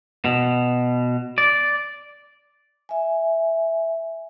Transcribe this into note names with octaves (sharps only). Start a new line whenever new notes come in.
B2
D5
E5 G#5